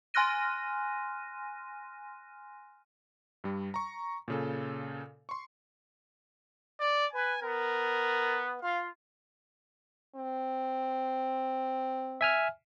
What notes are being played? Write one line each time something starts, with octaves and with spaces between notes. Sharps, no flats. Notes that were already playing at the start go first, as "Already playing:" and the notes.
G#5 C6 F6 F#6 A#6 D#7
G2 G3
A#5 C#6
A#2 C#3 A4
C6 C#6
D5
B4 G#5
B3 A#4
F4 F5
C4
E5 G#5 F6